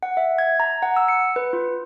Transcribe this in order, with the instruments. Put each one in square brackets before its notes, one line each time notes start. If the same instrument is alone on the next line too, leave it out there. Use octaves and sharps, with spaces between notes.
[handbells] F#5
E5
G#6
A#5
F#5
E6
C#7
B4
F4